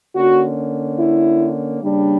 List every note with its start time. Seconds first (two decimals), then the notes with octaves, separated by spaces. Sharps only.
0.16 D3 A#3 C#4 F#4
0.99 E4
1.82 C#3 G3 A#3 D4